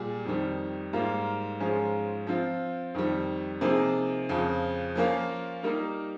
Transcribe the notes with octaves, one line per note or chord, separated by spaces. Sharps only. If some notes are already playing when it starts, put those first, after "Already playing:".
Already playing: A#2 G3 G#4
F2 D#3 G3
G#2 G3 A#3 F4
G#2 F3 G#3 C#4 F4
F3 C4 F4
F2 D#3 G3
C3 F3 A#3 D#4 G#4
F2 C#3 F3
F3 A#3 C#4 F4 A#4
G3 A#3 D#4 A#4